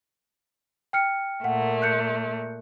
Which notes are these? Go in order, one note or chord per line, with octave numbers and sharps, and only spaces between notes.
G5 F6 C#7
A#2 A3 A#3 F#5
F#6 G6 C#7